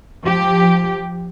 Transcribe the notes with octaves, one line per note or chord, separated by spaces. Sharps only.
F3 G4